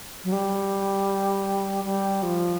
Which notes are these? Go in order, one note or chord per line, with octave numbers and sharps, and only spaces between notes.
F#3
G3
G3
F3